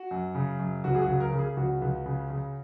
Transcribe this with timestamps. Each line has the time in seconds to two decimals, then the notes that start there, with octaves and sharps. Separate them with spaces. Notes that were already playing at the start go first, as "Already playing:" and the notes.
Already playing: F#4
0.11 F#2
0.35 C#3
0.59 F#2
0.84 C#2 F#4
0.95 G#4
1.02 F#4
1.08 C#3
1.20 A#4
1.32 C#3
1.39 G#4
1.57 C#2 F#4
1.82 C#2
2.06 C#3
2.30 C#3